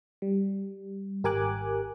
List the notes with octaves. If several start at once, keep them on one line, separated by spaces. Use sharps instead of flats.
G3
G#1 G4 A#4 G#5 D6 F#6